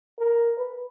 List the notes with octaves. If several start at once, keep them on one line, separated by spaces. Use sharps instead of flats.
A#4
B4